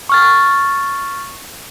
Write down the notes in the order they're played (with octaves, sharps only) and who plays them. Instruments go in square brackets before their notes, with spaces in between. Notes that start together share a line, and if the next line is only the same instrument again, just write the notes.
[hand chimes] C#6 F6 A6